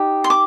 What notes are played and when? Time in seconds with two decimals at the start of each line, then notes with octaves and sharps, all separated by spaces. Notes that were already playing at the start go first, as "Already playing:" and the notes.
Already playing: D#4 G4
0.24 C6
0.30 D6